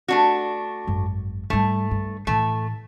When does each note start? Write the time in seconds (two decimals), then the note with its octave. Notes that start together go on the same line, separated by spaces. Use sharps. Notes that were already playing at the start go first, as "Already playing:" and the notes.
0.08 A3 D4 F#4
0.87 G#1 F#2
1.50 G#2 G3 A3
1.91 G2 D3
2.27 A2 E3 A3